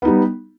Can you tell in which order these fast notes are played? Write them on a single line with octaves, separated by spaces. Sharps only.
B3 D#4 G3